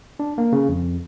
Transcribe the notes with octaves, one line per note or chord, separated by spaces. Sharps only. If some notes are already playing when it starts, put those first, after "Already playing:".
D4
A#3
C#3
F2